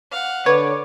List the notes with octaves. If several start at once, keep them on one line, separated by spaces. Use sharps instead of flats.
F5 F#5
D3 B4 C#5 D5